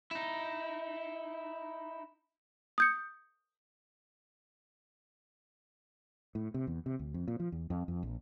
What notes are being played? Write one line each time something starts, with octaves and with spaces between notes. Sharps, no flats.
D#4 E4
D#6 G6 C#7
A2
C3
E2
C3
D2
F2
A#2
F3
E2
F2
F2
A#1